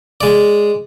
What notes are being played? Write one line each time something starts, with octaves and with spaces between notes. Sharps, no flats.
G#3 D5